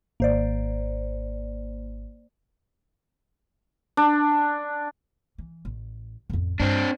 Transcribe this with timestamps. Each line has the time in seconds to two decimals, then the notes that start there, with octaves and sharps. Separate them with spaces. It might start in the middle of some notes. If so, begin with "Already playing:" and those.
0.20 G#1 A#3 C5 D5
3.97 D4
5.38 E3
5.65 A1
6.30 A1 F2
6.60 G2 C4 D4